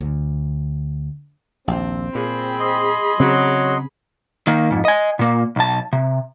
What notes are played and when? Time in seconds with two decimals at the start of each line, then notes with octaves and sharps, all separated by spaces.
0.01 D2
1.68 A#1 D#2 C4
2.15 A#2 G#4 B5
2.59 D#5 C6
3.20 C#3 F#3 C4
4.47 D#3 A#3
4.70 F2 G#2
4.85 D#5 G#5
5.19 A#2 A#3
5.56 B1 A5
5.93 C3